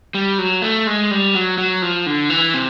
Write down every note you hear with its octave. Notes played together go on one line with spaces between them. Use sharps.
G3
F#3
A3
G#3
G3
F#3
F#3
F3
D3
E3
C3